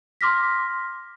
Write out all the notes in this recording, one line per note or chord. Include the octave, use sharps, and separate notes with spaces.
C6 D6 F6 A#6 B6